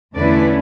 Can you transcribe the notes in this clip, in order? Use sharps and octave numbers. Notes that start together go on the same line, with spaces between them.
E2 D3 A3 C#4 E4 B4 D5